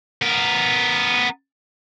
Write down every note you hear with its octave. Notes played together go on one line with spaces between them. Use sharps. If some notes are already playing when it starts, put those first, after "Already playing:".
B3 A#4